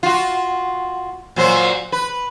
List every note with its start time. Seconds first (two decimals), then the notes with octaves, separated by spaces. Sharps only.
0.03 F4 F#4
1.36 A#2 F#3 C5
1.92 B4